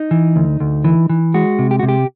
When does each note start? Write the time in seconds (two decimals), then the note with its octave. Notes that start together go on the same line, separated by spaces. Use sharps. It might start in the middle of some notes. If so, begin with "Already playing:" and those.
Already playing: D#4
0.11 E3
0.36 D2
0.60 D2
0.84 E3
1.10 E3
1.34 G#3 F#4
1.59 C3
1.71 G4
1.79 C3 F#4
1.89 G4